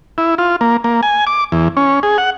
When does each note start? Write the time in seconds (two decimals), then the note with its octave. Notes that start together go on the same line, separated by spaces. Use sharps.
0.18 E4
0.38 F4
0.61 A#3
0.84 A#3
1.03 G#5
1.27 D6
1.52 E2
1.77 C#4
2.03 G#4
2.18 F#5